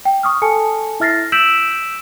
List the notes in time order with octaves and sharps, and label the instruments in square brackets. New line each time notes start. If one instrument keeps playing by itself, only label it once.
[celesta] G5
C#6 D#6 F6
A4 G#5 A5 C#7
E4 E5 F6 A6 A#6 C7
E6 G6 B6 D7 E7 F#7